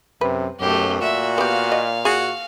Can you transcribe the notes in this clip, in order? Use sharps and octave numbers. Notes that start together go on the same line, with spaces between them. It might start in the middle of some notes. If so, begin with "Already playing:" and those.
F#2 C3 B4
B1 F#2 A3 G4
A#2 F#4 E5
B3 G4 F5
D#5
F#4 G#4